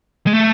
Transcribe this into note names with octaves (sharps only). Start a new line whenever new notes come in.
G#3
A3